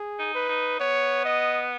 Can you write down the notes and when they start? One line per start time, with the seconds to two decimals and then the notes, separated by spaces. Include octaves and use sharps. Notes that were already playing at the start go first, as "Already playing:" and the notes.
Already playing: G#4
0.19 D#4
0.35 B4
0.49 D#4
0.80 B3 C#5
1.25 D#5